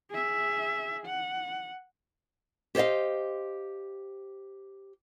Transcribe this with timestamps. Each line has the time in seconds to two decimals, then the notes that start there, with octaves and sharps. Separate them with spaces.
0.11 G#4 E5
1.06 F#5
2.75 G4 C5 C#5 D#5 F5